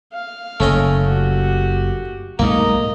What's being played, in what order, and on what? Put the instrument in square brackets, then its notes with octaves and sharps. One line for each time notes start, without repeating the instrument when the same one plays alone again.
[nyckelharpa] F5
[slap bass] F#1 [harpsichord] A3 C#4 D#5
[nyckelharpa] F#4 G4
[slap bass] B1 G#2 A3 [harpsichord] A#3 [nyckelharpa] D#5 A#5